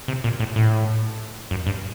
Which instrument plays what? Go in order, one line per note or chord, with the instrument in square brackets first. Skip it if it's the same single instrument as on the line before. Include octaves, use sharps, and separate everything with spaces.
[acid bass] C3
A#2
A2
A2
F#2
G2